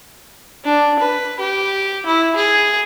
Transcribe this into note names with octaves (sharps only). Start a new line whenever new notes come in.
D4
B4
G4
E4
G#4